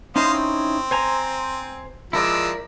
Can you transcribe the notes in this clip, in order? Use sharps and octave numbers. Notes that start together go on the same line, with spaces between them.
C#4 D#4 E4 C5 D#5 F5
C4
C5 G#5 A#5
F3 G#3 E4 A#4 D5 E6